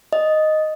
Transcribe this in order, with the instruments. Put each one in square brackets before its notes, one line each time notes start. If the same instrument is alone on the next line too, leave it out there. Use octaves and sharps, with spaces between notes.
[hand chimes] D#5